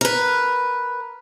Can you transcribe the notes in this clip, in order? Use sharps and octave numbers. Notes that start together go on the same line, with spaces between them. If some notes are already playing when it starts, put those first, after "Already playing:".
A#4 B4